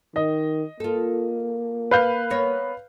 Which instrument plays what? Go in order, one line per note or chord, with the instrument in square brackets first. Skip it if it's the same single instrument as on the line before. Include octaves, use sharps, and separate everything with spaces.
[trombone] D#3 [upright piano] D#5
[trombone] A#3 [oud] F4 A4
[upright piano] B4 F5 G6
[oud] B3 A#4 C#5